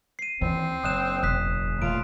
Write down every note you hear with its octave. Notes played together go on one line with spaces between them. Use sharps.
C7 D#7
D#2 E3 F3 C4 C#4
F#1 D4 D#6 F#6 E7
E1 D#6 F#6 B6
D#2 A#2 A3 F4 D7